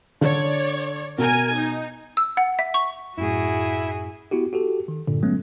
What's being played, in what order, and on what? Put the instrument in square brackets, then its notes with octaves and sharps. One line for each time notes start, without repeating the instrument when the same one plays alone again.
[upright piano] D3 [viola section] C#5 D5
[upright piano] B2 [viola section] A#4 G#5
[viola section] D#4
[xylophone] E6
F#5
E5
C#6
[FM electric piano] F#2 A2 [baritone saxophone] E4 [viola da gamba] F#4 G#4
[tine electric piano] B3 E4 F#4 G4
F#4 G4 A4
D#3
G2 A#2 D3
F#3 G#3 A3 B3 C#4